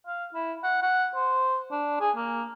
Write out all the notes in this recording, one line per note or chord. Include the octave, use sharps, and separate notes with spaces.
F5
E4
F#5
F#5
C5
D4
G#4
A#3